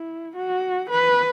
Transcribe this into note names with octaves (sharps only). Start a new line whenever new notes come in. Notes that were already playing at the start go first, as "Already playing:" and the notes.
Already playing: E4
F#4
B4